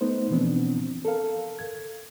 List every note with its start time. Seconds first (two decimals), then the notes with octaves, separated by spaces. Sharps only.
0.01 A3 B3 D#4 C5
0.30 B2 E3 F3 B3 C4 D4
1.05 A4 A#4 F5
1.59 G#6